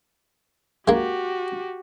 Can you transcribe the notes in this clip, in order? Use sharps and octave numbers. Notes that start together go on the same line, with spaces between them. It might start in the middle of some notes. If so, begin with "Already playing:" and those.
G#3 A#3 F#4 G4